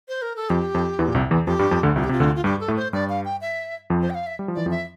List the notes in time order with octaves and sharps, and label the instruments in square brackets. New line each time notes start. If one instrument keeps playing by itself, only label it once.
[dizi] C5
A#4
A4
[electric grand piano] F2 F3 [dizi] G4
[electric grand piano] F2 F3
E2 E3
A#2
C2 C3
E2 E3
[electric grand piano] F2 F3 [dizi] G4
[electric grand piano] G2 G3
F2 F3
D2 D3
[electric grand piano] C2 C3 [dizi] F4
[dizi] G4
[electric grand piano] C3 [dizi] F4
[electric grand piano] D2 D3
[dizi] F4
[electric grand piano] G2 G3 [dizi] G4
[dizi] A4
[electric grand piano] A2 A3
[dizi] C5
[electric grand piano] G2 G3 [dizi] D5
[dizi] F5
G5
E5
[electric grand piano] F2 F3
[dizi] C5
G5
F5
E5
[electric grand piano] G3
F3
[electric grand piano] E3 [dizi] D5
[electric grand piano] F2 F3
[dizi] E5